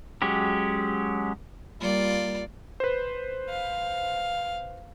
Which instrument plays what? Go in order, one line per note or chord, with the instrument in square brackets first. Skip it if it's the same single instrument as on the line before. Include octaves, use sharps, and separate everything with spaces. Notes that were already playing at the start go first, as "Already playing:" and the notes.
[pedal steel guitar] F#3 G#3 C#4 G4
[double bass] G3 A#3 [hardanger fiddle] F4 D5
[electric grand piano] B4 C5
[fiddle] F5